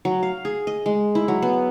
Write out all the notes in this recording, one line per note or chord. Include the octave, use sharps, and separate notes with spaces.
F#3
F5
G#4
D#5
G#3
E4
F#3
B3